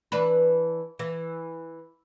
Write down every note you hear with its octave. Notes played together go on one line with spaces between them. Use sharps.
E3 D4 B4
E3